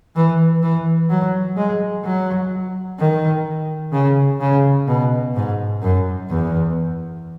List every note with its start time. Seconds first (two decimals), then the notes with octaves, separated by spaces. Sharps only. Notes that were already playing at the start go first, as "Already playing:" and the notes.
0.16 E3
0.62 E3
1.10 F#3
1.57 G#3
2.04 F#3
2.99 D#3
3.93 C#3
4.40 C#3
4.87 B2
5.35 G#2
5.82 F#2
6.29 E2